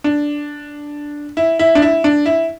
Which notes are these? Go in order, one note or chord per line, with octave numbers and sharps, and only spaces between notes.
D4
E4
E4
D4
E4
D4
E4